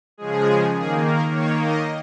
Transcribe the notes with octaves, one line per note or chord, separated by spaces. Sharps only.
C#3 F3 G#3 G#4
D#3 A#3 G#4
A#4
D#3 A#3 C#5
D#5